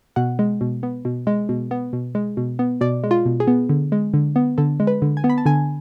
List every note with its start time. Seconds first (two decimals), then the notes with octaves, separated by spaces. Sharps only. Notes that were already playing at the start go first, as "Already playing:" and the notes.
0.16 B2 F#5
0.39 G#3
0.61 B2
0.83 B3
1.05 B2
1.27 G#3
1.49 B2
1.71 B3
1.93 B2
2.15 G#3
2.37 B2
2.59 B3
2.81 B2 D5
3.04 G#3
3.11 F4
3.26 B2
3.40 G#4
3.47 B3
3.70 D3
3.92 G#3
4.14 D3
4.36 B3
4.58 D3 A4
4.80 G#3
4.87 B4
5.02 D3
5.17 G#5
5.24 B3
5.30 B5
5.38 A5
5.46 D3 G#5